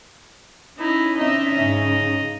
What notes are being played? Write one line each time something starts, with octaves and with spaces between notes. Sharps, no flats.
C#4 D#4 E4
C4 D4 D#4 D#5 E5
G#2 C#3